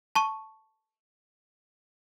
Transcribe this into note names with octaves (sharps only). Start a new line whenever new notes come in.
A5 C#6 D#7